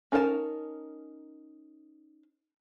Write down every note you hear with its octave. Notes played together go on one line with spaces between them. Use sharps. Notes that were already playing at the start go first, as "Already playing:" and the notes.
C#4 D#4 A#4 D#5 A5